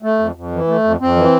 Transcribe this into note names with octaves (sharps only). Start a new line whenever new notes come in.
A3
F2
F2
E3
A3
F2
F2 C4
E3